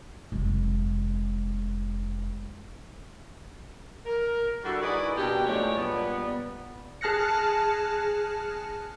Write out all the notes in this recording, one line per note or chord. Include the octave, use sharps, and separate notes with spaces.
F1 G#3
A#4
D3 G3 E4 F#4
D#4 E4 F#4 G#4 B4 D5
B2 A#3 C#4 D4 G4
A2 F3 F#3 G#3 C#5 D5
G2 A#2 G3 B3
G#4 A5 F6 F#6 A#6 C#7